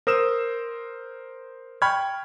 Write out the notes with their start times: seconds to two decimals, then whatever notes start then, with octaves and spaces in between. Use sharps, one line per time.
0.07 A#4 C5 D#6 E6 E7
1.82 G5 B5 C#6 F6 G#6